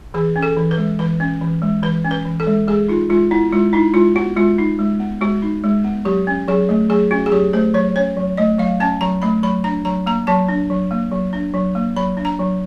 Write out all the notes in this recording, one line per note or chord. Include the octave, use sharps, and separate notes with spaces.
E3 G#4
C#4
A4
E3
B4
G#3
E3 B4
C#4
E3
G#3
E3 B4
C#4
B4
E3
A4
G#3
G#3 G#4
D#4 F4
G#3 F4
B3 E4
G#3 F4
D#4 E4
G#3 F4
B3 F#4
G#3 F4
D#4
G#3
B3
G#3 F#4
D#4
G#3
B3
F#3 G4
C#4
F#3 G#4
A3
F#3 G#4
C#4 F#4
G#4
F#3 G4
A3 C5
F#3 C#5
C#4 C#5
F#3
A3 D#5
F#3 F5
C#4 A5
F#3 A#5
A3 B5
F#3 B5
D4 A#5
F#3 A#5
A#3 A#5
F#3 A5
D4
F#3
A#3
F#3
D4
F#3
A#3
F#3 B5
D4
A#5
F#3